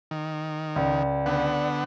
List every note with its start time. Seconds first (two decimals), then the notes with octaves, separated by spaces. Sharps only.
0.11 D#3
0.76 C#2 D5
1.26 D3 B3 F#5